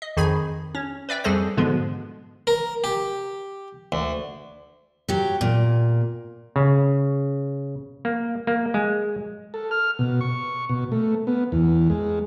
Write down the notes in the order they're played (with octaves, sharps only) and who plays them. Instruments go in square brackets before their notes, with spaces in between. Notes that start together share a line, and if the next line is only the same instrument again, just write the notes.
[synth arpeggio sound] D#5
F2 D#3 G#4 B5 G#6
C#4
B4 D5 E5 G5
F2 G3 G#4 A4 C5 A#6
G#2 B2 D3 F3 G#3 B3
[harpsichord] A#4
G4
D2
[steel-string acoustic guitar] F#3 G4
A#2
[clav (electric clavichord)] C#3
A#3
A#3
G#3
[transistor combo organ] A4
F6
B2
C#6
B2
A3
B3
E2
G#3